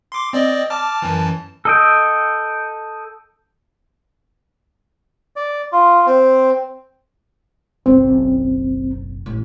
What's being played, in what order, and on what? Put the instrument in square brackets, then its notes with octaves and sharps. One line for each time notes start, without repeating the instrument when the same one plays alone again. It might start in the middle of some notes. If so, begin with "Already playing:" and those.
[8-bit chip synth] C6 D6
C4 D5 D#5
A5 D6 F6
F#2 E3 A5
[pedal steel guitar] A4 D#5 G5
[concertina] D5
F4
C4
[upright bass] F#1 B1 [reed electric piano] C4
[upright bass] A1